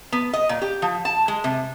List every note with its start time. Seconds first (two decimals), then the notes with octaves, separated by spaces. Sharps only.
0.12 B3
0.33 D#5
0.49 A#2
0.61 G4
0.82 F3
1.05 A5
1.28 G#3
1.44 C3